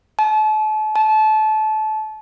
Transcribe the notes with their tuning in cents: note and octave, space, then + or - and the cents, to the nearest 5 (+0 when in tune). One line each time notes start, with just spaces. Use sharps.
A5 -40
A5 -25